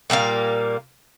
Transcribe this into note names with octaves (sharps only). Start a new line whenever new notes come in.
A#2 G3 A#3 F5